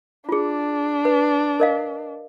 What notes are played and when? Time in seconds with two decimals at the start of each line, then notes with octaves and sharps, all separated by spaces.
0.29 D4 F4 G#4
1.05 B4
1.60 A#4 D#5 F5